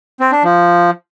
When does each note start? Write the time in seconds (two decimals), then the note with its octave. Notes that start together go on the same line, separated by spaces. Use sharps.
0.20 C4
0.32 D4
0.44 F3